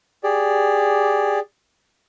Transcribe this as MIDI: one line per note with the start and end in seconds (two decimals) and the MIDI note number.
0.24 1.39 67
0.24 1.39 68
0.24 1.39 74